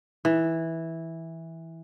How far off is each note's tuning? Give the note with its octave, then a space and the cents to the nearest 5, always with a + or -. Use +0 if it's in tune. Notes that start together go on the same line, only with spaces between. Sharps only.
E3 -10